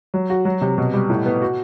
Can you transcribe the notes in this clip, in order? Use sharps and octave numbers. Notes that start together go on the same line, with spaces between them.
F#3
F#4
F#3
C3
B2
G3
A2
B3
F#4